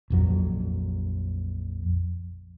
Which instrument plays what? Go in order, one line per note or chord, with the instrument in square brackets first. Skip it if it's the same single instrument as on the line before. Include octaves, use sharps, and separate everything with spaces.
[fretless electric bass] A#1 F2 F#3